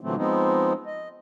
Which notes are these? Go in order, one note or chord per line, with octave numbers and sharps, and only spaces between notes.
A#2 D3 E3 F#3 A3 C4
F3 G#3 B3 C4 D#4
D#5